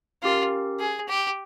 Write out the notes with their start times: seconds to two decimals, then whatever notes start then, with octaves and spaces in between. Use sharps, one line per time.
0.23 C#4 F4 G4 A#4
0.80 G#4
1.09 G4